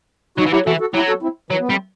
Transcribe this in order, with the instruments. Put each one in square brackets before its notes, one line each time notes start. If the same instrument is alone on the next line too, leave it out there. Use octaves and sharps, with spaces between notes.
[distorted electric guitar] F#3 [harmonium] D#4 F#4
[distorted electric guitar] E3
[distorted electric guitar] F#3 [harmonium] E4 G4
[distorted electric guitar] E3 [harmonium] F#4 A4
[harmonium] F#4 A4
[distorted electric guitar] F#3 [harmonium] E4 G4
[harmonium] F#4 A4
C4 E4
[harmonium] E3 [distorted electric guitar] F#3
[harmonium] B3
[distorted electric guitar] G3 [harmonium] A3 C4